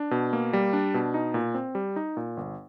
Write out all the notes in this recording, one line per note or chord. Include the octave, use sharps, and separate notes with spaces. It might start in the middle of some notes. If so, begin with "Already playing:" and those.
Already playing: D4
B2
A#3
G3
D4
B2
D#4
A#2
C4
G3
D#4
A#2
G1